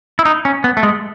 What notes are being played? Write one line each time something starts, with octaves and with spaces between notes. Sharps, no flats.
E4
D#4
C#4
B3
A3
G#3